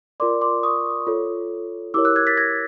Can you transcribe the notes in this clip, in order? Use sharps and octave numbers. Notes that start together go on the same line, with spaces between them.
F4 A#4 D5 C6 D6
C6 D6
C#6 D#6
F4 A4 C#5
E4 G4 A#4 C#5 D6 E6
E6 F#6
F#6 G#6
A6 B6
G#6 A#6